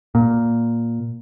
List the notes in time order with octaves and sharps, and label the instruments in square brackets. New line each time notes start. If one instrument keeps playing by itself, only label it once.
[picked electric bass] A#2